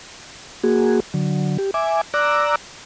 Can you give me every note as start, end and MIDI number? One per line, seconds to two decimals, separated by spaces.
0.64 1.00 58
0.64 1.00 66
0.64 1.00 68
1.14 1.57 50
1.14 1.57 54
1.58 1.71 67
1.74 2.01 76
1.74 2.01 80
1.74 2.01 86
2.14 2.56 74
2.14 2.56 82
2.14 2.56 86
2.14 2.56 88
2.14 2.56 90